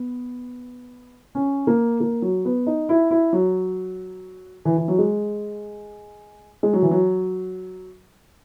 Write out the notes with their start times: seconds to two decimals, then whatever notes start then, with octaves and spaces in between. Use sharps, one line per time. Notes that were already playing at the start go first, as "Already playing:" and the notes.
Already playing: B3
1.35 C#4
1.67 A#3
2.00 A#3
2.22 F#3
2.45 B3
2.67 D#4
2.89 E4
3.11 E4
3.33 F#3
4.65 E3
4.78 E3
4.88 F#3
4.98 G#3
6.63 G#3
6.73 F#3
6.82 E3
6.91 F#3